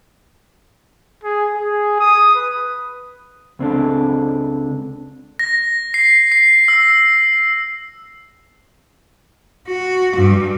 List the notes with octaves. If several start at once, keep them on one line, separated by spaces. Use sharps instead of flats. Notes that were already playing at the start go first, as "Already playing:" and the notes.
G#4
G#4
D#6
B4
C#2 C4 D4 A4
A#6
C7
C7
E6
F#4
G2